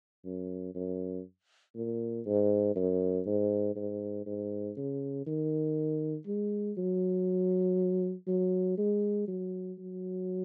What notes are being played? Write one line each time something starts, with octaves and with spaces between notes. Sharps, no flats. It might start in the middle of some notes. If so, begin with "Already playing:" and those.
F#2
F#2
A#2
G#2
F#2
G#2
G#2
G#2
C#3
D#3
G#3
F#3
F#3
G#3
F#3
F#3